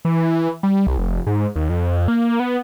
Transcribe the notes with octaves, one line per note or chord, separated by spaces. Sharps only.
E3
G3
C2
F1
G#2
D#2
F2
A#3
B3